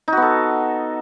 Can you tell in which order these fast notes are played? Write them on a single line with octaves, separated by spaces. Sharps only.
D#4 F#4 B3 A4